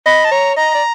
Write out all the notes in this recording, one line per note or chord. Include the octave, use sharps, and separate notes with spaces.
D#5 B5
A5
C#5 A#5
D#5 A#5
D5